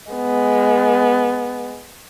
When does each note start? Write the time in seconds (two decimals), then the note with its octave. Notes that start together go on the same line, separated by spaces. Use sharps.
0.12 G#3 B3